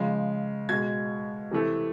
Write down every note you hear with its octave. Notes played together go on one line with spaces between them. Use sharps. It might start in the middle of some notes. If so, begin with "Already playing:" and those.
Already playing: C#3 F3 G#3
B2 G#3 G#6
C3 E3 A3